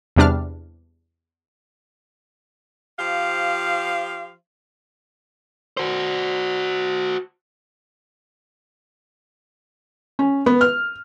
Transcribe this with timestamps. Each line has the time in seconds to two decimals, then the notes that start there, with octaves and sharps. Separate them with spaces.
0.16 E2 C3 G3 D4 D6 F6
2.99 F3 G4 C5 F5
5.77 F#4 C5
10.19 C#4
10.46 B3
10.61 F6